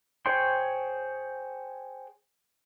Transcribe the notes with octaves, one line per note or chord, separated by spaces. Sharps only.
G#4 C5 C#5 G5 C6